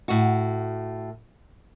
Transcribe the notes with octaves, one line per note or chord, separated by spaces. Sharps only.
A2 F#4